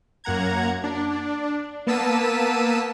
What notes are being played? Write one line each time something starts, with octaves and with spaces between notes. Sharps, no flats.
F#2 A#3 F#5 A#5 G#6
D4
A#3 B3 A5 E6 B6 D#7